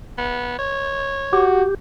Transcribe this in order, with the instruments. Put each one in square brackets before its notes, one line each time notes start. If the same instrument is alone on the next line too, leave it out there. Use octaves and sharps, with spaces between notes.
[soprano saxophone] B3
C#5
[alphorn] F#4 [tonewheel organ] G4